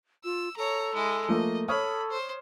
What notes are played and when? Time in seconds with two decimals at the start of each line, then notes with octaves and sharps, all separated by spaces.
0.25 F4 E6
0.57 A4 C#5 A#5
0.94 G#3 E4
1.29 F3 A3 A#3 D#5
1.68 A4 C#5 B5 D#6 F6
2.11 C5